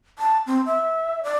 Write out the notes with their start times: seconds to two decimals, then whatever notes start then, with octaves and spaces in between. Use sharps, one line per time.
0.19 A5
0.47 C4
0.66 E5
1.24 D5